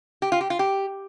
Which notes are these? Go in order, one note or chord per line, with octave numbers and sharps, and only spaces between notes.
G4
F4
G4
F4
G4